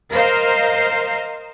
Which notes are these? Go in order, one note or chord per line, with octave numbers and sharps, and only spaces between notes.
A#4 C5 D#5 F5